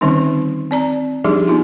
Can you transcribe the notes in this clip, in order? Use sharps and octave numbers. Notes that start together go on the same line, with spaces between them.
D3 D#3 G3 C4 C#4 D#4
C4 D5 A#5
F3 G3 D4 D#4 G4 G#4
B3 D#4 F4